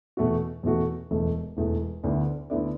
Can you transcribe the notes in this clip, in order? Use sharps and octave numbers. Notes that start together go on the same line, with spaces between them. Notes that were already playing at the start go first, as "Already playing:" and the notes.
E2 B2 A3 F#4
E2 B2 A3 F#4
E1 E2 E3 A3
E1 E2 E3 A3
D2 D3 B3 E4 D5
D2 D3 B3 E4 D5